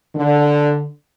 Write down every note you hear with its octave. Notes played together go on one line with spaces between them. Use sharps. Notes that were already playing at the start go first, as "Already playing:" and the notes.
D3